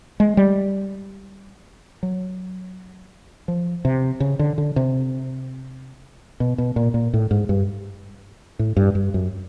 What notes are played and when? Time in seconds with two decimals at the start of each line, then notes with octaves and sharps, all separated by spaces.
0.20 G#3
0.37 G3
2.03 F#3
3.48 F3
3.85 C3
4.20 C#3
4.39 D3
4.58 D3
4.76 C3
6.40 B2
6.58 B2
6.76 A#2
6.94 A#2
7.13 A2
7.31 G#2
7.49 G2
8.59 A2
8.77 G2
8.95 G2
9.14 F#2